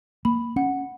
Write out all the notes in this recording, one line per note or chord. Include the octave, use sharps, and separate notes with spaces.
A#3 B5
C#4 F#5